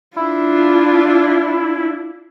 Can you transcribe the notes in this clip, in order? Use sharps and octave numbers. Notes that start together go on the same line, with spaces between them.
D4 E4 F4